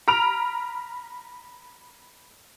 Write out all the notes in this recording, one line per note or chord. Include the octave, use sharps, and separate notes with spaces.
A#5 B5 F6 D7 F7